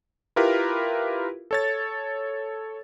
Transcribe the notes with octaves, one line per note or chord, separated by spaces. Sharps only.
E4 F4 G4 A#4 B4
A4 C#5 A6